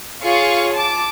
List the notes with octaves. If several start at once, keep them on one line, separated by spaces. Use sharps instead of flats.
F4 G#4 C#5 F5 C#6
A5 D6